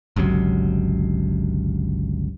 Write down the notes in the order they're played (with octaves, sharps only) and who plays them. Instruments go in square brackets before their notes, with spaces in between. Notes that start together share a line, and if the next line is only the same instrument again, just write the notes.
[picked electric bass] G1 C#2 C3 F#3